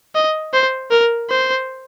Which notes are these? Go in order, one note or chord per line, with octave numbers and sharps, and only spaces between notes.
D#5
C5
A#4
C5